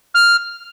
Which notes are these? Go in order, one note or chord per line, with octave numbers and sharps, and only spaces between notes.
F6